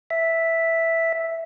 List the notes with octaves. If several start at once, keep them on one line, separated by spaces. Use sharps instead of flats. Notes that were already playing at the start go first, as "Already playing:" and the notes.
E5